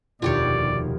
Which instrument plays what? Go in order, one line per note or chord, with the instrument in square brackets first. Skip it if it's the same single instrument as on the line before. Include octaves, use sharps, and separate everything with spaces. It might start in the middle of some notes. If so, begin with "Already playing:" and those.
[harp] F1 D#2 [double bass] B2 [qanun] F4 G4 C#5 [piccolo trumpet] D5